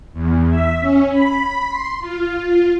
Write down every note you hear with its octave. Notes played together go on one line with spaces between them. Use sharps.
E2
E5
C#4
B5
C6
F4
F4